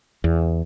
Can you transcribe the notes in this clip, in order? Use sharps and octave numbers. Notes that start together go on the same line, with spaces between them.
E2